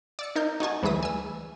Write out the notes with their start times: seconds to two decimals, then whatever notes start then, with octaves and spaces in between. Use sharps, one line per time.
0.19 D5 E6 C#7
0.35 D#4 A#4 G6
0.60 D#4 F#4 G#5 A5
0.83 D2 E3 G3 G#4 E5 D#6
1.03 G#5 E6